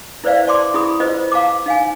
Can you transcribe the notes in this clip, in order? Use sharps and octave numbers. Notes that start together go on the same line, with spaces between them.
E4 B4 C5 D5 E5 F5
D5 A5 C6 D6
E4 G#4 B5 D#6
F4 B4 C5 D#5
F5 A5 A#5 D6
D#4 F5 G#5